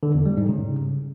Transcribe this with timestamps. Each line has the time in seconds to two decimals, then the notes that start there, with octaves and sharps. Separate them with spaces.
0.03 D3
0.14 E2
0.26 G3
0.37 G#2
0.49 C#3